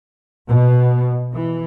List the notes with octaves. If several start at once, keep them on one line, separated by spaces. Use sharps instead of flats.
B2
E3